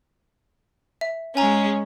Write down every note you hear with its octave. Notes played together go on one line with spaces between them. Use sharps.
E5
G#3 C#4 G#5 A#5